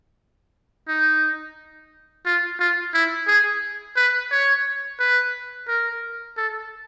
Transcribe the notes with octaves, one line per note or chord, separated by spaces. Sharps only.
D#4
F4
F4
E4
G#4
B4
C#5
B4
A#4
A4